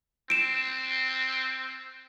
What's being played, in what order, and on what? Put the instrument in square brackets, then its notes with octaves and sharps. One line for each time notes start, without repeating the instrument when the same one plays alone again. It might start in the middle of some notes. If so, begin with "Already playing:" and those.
[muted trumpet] C4 [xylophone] D7 E7